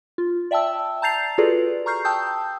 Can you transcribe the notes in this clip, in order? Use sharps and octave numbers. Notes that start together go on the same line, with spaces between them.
F4
D5 E5 G5 A5 E6
A5 A#5 G6 A6 C7 F7
F4 F#4 G#4 A4 B4 D5
A#5 C#6 F6 G6 C7
G5 A5 D#6 E6 G6